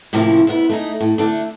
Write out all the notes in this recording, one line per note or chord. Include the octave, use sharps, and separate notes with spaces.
A2 C3 F3 A#3 C#4 E4
F2 B3 E4
A3 D#4 G#4
A2
D3 A3 D4